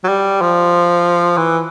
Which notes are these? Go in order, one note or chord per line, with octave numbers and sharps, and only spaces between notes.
F#3
G3
F3
E3